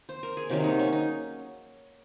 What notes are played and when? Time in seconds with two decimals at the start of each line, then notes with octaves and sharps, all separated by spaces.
0.09 C5
0.23 A#4
0.37 G#4
0.50 C3 D#3 F#3 A#3 F#4
0.64 D#4
0.79 C#4
0.93 D#4